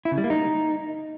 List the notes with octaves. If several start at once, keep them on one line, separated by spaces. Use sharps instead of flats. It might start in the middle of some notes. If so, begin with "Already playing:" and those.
E4
C#3
G3
A#3
D#4